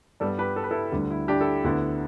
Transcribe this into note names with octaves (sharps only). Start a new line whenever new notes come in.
G2 G3 B3 A4 D5
G4 B4
A4
B4
E4 A4
D2 D3 G3
E4
D4 G4
E4 A4
D2 D3 B3 E4